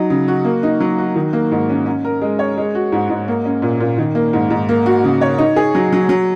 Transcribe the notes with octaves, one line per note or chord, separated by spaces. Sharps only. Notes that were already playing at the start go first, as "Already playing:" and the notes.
Already playing: F#3 D#4
C#3
F#4
A#3
D#4
F#3
F#4
D#3
A#3
G#2
C#4
C#4
A#4
G#3
C#5
G#3
F#4
G#2
G#2
A#3
C#4
A#2
A#2
D#3
A#3
G#2
G#2
A#3
F#4
C#3
C#5
D#4
G#4
F#3
F#3
F#3